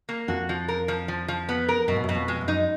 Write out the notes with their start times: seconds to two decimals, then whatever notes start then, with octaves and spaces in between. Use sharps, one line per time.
0.09 A#3
0.28 F2 F#4
0.49 F3
0.68 A#4
0.88 F3
1.08 F3
1.28 F3
1.49 B3
1.68 A#4
1.88 F#2 B2
1.96 G#2
2.04 F#2
2.09 B2
2.15 F2
2.28 G#3
2.41 F#2
2.48 D#4